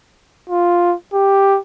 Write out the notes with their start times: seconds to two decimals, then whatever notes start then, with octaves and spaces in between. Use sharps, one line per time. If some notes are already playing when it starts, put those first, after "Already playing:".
0.50 F4
1.14 G4